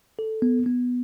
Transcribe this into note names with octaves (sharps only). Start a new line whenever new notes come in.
A4
B3
B3